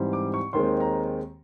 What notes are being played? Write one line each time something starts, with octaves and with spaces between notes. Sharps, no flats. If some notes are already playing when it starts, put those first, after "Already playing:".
Already playing: G#2 E3 G3 C4
D6
C#6
D#2 D#3 G#3 C4 C6
A#5